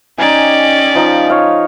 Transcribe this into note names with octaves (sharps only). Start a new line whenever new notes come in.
C#4 D#4 G4 D5 G#5
F3 D#4
C#5 F5